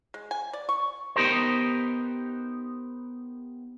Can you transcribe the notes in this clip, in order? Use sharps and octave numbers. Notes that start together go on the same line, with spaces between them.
G#3
G#5
D5
C#6
B3 D#4 G4 A#4 C5